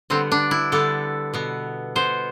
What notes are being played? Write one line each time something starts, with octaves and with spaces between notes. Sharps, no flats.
D3 G3 B3 C4
D4
E4
D3 G3 B3 A4
B2 B3
B2 B3 C5